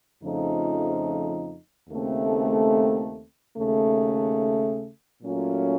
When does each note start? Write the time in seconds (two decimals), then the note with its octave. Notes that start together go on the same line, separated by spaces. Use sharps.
0.23 F2 C#3 F3 A3 D#4
1.90 D#2 C#3 A3 C4
3.57 D#2 C#3 A3
5.23 A#2 F#3 A3 C#4 F4